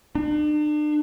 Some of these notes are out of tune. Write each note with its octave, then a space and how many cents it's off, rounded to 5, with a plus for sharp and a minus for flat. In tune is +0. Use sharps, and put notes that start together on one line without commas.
D4 +40